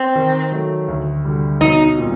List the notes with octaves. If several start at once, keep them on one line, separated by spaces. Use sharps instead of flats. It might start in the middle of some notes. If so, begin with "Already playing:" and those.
Already playing: C4
D#3
F#3 A3
D2
D3 G3
B1 D#4
A#2 G3 C4 D#4